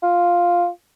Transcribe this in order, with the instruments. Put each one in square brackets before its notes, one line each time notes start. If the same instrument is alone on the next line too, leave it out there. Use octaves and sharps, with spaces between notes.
[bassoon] F4